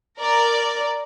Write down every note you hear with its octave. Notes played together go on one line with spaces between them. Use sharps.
A#4 D5